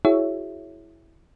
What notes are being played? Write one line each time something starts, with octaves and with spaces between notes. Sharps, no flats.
E4 F#4 G#4 C#5 E5